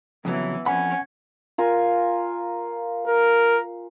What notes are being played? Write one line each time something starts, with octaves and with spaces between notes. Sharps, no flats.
F2 C#3 E3 F#3 B3
F2 C#4 F#5 G#5 B5
F4 A#4 G#5
A#4